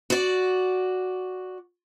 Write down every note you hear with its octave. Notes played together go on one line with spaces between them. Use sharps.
F#4 D5